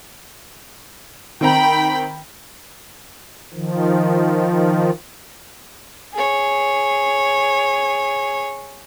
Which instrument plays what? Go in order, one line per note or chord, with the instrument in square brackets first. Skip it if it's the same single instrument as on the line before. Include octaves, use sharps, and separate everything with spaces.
[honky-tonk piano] D#3 C4 A#5 [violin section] G5 B5
[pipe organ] D#3 F3
[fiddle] G#4 C#5